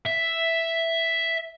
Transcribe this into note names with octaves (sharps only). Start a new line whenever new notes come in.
E5